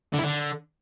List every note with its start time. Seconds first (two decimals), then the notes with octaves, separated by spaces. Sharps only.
0.13 D3
0.18 E4
0.23 D3